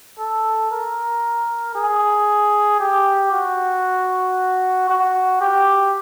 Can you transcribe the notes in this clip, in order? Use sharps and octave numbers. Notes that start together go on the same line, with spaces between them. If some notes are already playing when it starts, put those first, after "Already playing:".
A4
A#4
G#4
G4
F#4
F#4
G4